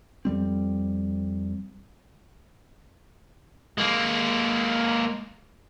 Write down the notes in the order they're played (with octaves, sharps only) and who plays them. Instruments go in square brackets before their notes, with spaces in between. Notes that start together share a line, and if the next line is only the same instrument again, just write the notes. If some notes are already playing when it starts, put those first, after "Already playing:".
[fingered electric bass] F2 G3 C4
[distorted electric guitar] G#3 A#3